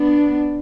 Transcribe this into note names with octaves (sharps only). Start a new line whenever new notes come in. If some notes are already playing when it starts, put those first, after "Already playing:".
Already playing: B3 D4